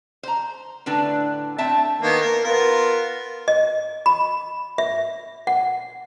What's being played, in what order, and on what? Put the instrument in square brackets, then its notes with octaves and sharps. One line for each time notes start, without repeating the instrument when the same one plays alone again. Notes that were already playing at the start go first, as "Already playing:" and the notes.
[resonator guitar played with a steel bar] C5 A#5
A2 D3 D4 B4
A3 C4 E5 A5
[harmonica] D#3 A#3 B3
A#4
B3 F4 A#4
[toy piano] D#5
B5
E5
F#5